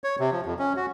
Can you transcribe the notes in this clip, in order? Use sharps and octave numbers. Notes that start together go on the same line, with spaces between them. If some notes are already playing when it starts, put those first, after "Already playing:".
C#5
C3
F3
F2
C#4
F#4